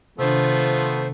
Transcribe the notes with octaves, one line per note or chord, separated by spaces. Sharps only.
C3 D#3 F3 A3 B3 D4 C5